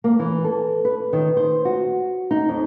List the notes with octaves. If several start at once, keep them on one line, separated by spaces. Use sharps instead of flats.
A#3
E3
A4
B4
D#3
C5
F#4
D#4
F2